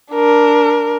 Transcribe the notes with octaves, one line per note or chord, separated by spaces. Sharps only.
D4 A#4